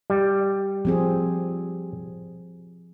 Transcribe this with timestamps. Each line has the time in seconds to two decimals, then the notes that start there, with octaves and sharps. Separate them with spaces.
0.10 G3
0.85 F3 C4 G#4